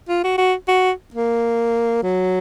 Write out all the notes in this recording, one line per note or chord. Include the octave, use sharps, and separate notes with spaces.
F4
F#4
F#4
F#4
A#3
F#3